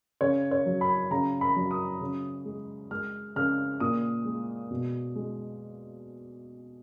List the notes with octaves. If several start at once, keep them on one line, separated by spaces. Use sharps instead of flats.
C#3 C#5
C#5
F#3
B5
C#3 A#5
B5
F#3
D#6
C#3
G#3
G#3 F6
C#3 F6
A#2 D#6
G#3
B2
G#3